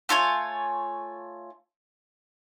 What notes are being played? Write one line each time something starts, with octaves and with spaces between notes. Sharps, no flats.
A3 F4 C#5 G#5